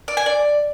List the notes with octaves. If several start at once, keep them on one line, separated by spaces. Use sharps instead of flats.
D5
G#5
D5